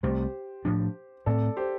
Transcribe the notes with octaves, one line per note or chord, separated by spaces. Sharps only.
C2 C3 A3 G4 C5
A2 F3 D4
A2 A3 C4 A4 D5
G4 C5